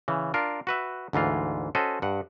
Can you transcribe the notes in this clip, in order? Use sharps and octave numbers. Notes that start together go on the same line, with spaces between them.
C#3 E3
D4 F4 A#4
F#4 B4 E5
D2 G#2 E3 F4
C#4 F#4 A4 C5 D#5
G2 F#5